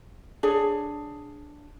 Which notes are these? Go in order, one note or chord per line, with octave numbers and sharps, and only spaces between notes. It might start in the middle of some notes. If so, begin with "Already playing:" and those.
D4 G#4 C#5